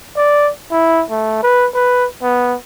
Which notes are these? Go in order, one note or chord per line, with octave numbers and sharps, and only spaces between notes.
D5
E4
A3
B4
B4
B3